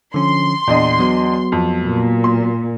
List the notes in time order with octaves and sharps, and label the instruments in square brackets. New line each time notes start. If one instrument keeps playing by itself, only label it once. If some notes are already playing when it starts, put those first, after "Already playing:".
[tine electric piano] D3 F3 C#4 [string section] C6
[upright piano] E2 D4 D#5 [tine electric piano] A#2
[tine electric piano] F#3 B3 F#4
[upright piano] F2
[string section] A#2
[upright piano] C6